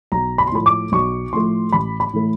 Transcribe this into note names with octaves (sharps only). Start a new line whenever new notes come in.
B1 A#5
B5
C6
A2 F3 A3 B5
D6
B1 C#6
A2 F3 A3 C6
A1 B5
B5
A2 E3 A3